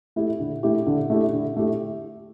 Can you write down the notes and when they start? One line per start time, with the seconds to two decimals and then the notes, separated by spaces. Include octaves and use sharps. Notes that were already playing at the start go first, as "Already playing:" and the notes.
0.16 A3 E4 G4
0.40 D3
0.63 A3 E4 G4
0.86 D3
1.10 A3 E4 G4
1.33 D3
1.57 A3 E4 G4